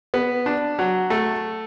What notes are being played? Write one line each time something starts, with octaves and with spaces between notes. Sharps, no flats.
B3
D4
F#3
A3